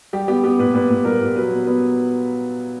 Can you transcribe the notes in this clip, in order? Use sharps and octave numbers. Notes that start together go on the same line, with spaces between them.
G3 G4
B3 G4
B3 G4
A#2 B4
A#2 B4
A#2
G3 A#4
A#2
F#3 B4
B3
B3 B4